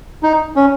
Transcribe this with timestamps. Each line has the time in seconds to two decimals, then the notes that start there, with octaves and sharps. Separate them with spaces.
0.23 D#4
0.56 C#4